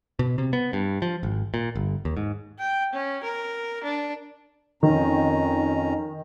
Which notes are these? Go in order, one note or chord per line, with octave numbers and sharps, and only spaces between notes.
B2
C3
B3
G2
F3
G#1
A#2
G1
D#2
G#2
G5
C#4
A#4
D4
F2 D#3 C#4 A#5